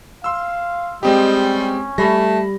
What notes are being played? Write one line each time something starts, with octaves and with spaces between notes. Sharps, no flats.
F5 C6 E6
G3 G#3 C4 G4 D#5
C#4
G3 A3 B5 A#6